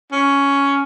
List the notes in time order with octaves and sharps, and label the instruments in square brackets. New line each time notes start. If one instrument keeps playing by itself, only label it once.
[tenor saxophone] C#4